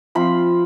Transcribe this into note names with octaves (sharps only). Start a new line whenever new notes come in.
F3 C4 F4 B5